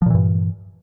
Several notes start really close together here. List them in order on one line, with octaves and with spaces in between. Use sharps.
F3 A#2 E3 G2